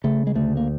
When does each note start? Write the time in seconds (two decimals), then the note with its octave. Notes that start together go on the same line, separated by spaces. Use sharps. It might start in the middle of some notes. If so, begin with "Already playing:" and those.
0.04 C#3 A3
0.27 G#3
0.35 D2 A3
0.57 A#3